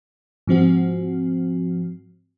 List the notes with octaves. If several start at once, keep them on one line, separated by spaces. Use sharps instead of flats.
G#2 F3 C4 F#4